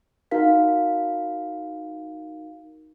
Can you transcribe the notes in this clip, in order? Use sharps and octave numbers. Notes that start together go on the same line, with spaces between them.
D#4 F#4 A#4 F5 B6